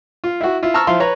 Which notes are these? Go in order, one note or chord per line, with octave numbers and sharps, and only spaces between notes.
F4
E4 F#4
E4 F4
A5 A#5 C#6 E6 F6
F3 E4 F5 C6
B4 C#5 A#5